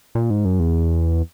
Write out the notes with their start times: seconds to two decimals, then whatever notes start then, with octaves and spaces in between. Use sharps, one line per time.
0.15 A#2
0.30 G#2
0.45 F#2
0.60 E2